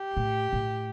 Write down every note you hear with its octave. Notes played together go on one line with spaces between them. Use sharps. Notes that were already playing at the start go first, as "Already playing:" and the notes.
Already playing: G4
A2
A2